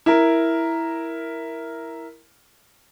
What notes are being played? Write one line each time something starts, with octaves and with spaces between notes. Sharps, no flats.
E4 A#4